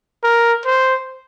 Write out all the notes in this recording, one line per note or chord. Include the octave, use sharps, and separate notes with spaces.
A#4
C5